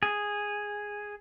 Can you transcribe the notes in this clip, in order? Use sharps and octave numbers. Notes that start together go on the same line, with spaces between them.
G#4